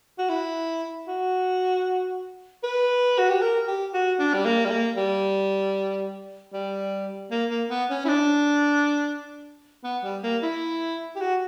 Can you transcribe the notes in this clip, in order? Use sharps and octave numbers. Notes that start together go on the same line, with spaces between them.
F#4
E4
F#4
B4
F#4
G4
A#4
G4
F#4
D4
G3
A#3
G3
A#3
G3
G3
A#3
A#3
B3
C#4
E4
D4
B3
G3
A#3
E4
G4
F#4